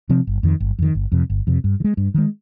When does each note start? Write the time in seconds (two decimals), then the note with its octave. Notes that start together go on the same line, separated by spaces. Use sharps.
0.09 C3 F3 C4
0.27 G1
0.43 F2 D#3
0.60 G1
0.79 F2 D#3
0.95 G1
1.12 F2 C3
1.30 G1
1.47 F2 C3
1.64 G2
1.80 D#3
1.84 G#3
1.97 G2
2.14 D#3 G#3